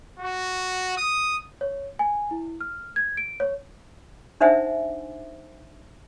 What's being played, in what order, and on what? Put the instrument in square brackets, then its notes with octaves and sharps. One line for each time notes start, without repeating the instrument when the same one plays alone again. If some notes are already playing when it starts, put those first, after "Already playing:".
[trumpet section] F#4
D#6
[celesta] C#5
G#5
E4
F6
G#6
D7
C#5
[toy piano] D4 D#4 C5 E5 F#5 G#5